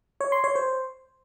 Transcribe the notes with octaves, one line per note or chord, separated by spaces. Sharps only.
C#5
C6
C#5
C5